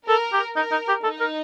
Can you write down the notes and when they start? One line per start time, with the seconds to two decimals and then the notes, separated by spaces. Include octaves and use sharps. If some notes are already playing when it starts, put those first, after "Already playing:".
0.08 A4 A#4
0.33 G4
0.56 D#4 A#4
0.71 D#4
0.88 G4
1.03 D#4 A4
1.20 A#4